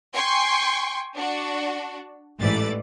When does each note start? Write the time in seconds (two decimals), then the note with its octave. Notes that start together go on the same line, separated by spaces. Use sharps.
0.15 G5 G#5 C6 C#6
1.16 D4 F#4
2.39 A1 G#2 E3 A3 D5 A6